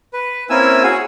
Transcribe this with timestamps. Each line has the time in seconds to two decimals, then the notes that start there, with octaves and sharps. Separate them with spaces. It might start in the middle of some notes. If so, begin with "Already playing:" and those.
0.13 B4
0.50 A#3 C4 C#4 E4 G#5 E6
0.83 F#4 G#4 C#5